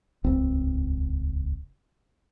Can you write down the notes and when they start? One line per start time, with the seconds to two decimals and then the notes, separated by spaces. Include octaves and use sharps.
0.24 D#1 G#1 C#2 C4